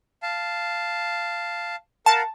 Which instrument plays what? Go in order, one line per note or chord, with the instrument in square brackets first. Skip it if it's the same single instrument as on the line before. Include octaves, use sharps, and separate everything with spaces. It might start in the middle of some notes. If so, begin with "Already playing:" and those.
[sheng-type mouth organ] F5 A5
[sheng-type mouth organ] A#4 F5 F#5 [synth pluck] A5